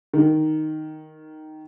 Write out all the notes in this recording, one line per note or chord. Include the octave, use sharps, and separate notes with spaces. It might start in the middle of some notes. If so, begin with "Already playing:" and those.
D#3